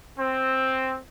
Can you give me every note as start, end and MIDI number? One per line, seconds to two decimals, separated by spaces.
0.17 0.98 60